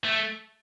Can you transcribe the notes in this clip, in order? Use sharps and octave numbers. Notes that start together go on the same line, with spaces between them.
A3